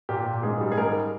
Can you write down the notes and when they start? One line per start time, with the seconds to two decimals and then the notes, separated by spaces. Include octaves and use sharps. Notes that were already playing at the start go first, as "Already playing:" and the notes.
0.09 A#2 G4
0.26 A#2
0.43 G#2 G#4
0.61 G3
0.72 G#4
0.77 G#2 A#4